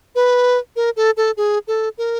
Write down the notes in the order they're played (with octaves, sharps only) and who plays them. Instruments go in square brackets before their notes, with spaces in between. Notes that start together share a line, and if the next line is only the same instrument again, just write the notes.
[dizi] B4
A#4
A4
A4
G#4
A4
A#4